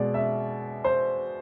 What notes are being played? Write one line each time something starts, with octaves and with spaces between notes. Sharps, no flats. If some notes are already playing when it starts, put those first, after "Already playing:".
Already playing: B2 G#3 D5
E5
C5